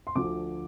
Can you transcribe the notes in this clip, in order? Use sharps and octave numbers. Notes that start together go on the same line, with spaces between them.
C6
D2 D3 F3 D6